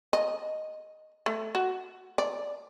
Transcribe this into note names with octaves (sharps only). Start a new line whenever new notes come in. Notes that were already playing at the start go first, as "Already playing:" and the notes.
D#5
A3
F#4
D5